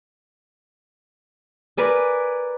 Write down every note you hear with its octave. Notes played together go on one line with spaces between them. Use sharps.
A#4 B4 D5 G#5